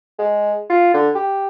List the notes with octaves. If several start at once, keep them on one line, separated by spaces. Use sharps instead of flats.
G#3
F4
D3
G4